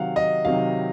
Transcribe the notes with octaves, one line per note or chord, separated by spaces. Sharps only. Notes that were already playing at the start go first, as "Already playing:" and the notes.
Already playing: C3 D#3 F#3 F5 F#5
D#5
C3 D#3 F#3 F5